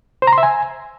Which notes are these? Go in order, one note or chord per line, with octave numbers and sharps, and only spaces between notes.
C5
A#5
C6
E5
G#5